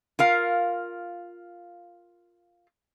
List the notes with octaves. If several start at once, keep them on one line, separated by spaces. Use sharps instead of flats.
F4 A#4 F5